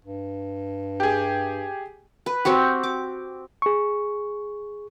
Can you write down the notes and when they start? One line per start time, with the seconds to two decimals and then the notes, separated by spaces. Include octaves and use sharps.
0.05 G2
1.00 G4 G#4
2.26 B4
2.45 C4 F#4 G4
2.83 D6
3.62 G#4 C#6